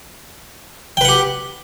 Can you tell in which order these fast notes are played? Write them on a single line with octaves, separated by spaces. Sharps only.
G5 B4 F#5 G4